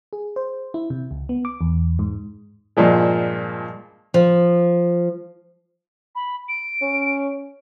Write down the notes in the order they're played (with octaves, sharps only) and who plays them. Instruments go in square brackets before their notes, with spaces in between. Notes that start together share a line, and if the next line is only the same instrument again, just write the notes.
[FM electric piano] G#4
C5
E4
C3
C#2
B3
D6
E2
G#2
[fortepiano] G2 A#2 F3 G#3
[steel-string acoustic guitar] F3
[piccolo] B5
D7
[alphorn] C#4